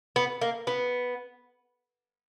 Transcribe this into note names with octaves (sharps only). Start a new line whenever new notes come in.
B3
A#3
B3